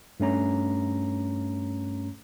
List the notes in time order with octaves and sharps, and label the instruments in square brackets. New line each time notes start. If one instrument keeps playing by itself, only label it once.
[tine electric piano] G2 A3 C#4 A#5